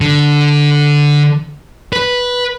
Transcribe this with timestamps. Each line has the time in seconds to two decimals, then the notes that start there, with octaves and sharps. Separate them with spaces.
0.01 D3
1.93 B4